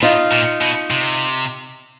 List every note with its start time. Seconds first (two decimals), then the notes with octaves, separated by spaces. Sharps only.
0.02 A2 D#4 F4
0.32 A#2
0.61 B2
0.91 C3